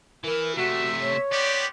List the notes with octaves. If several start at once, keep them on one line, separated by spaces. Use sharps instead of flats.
E3 E4 A#4
C3 A3 F#4 E5
C#5
B3 C4 G4 D5